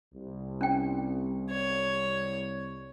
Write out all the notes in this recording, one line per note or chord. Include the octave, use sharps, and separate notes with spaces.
C2
C#4 G5
C#5